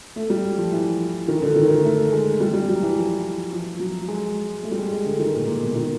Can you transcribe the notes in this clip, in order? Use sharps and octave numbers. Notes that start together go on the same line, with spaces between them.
A3
G3
F3
E3
D#3
D3
D#3
D#3
A3
G#3
G3
G3
F#3
E3
F3
F3
F#3
G#3
A3
G3
G#3
G#3
D3
D#3
A#2
A#2
B2
D#3